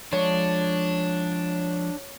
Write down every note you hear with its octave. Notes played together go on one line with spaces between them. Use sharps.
F3 G#3 D4 C#5